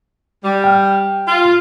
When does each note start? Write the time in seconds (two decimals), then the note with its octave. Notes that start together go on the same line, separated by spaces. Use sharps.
0.44 G3
0.64 G5 F6
1.27 F4